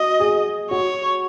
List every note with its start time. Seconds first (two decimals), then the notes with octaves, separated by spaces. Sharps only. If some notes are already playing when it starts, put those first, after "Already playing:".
Already playing: F#4 D#5
0.20 G#4
0.71 F#4 C#5